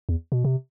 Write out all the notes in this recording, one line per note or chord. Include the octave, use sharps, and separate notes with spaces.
E2
B2
C3